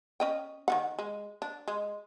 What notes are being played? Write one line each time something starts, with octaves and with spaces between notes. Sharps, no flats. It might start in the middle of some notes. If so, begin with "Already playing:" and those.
C#4 D#5 G5
D#3 E3 F#5
G#3
D4
G#3